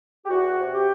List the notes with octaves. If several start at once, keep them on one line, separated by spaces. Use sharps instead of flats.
G4
E2 F#4
C3
G4